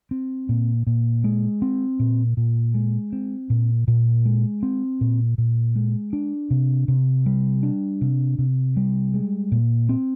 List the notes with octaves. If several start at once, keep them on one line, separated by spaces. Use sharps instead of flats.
C4
A#2
A#2
G#3
C4
A#2
A#2
G#3
C4
A#2
A#2
G#3
C4
A#2
A#2
G#3
D4
C3
C3
G3
D4
C3
C3
G3
G#3
A#2
C4